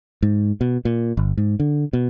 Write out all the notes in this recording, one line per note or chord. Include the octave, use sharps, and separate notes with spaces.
G#2
B2
A#2
G1
G#2
D3
B2